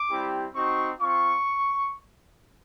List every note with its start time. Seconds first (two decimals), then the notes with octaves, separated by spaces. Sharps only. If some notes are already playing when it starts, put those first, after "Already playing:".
Already playing: D6
0.10 G3 C4 E4 G4
0.54 C4 D#4 F#4 C#6
1.00 C4 F4 C#6